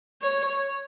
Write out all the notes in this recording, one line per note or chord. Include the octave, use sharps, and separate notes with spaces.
C#5